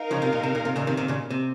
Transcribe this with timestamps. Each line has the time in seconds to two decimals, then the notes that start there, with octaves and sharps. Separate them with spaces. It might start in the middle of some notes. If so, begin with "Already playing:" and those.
Already playing: D#4 A#4 F5
0.11 C#3 F3
0.22 C3
0.33 A#2
0.43 C3
0.55 A#2
0.65 C3
0.76 A#2 C#3
0.87 C3 D#3
0.97 C3 D#3
1.08 A#2 C#3
1.30 C3